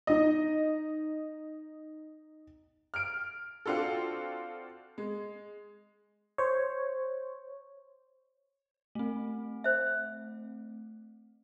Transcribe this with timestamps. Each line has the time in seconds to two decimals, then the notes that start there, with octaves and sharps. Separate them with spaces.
0.07 D#4 D#5
2.94 F6 D7
3.66 C4 D4 F4 F#4 A4
4.98 G#3
6.38 C5 C#5
8.95 A3 C4
9.64 C5 E5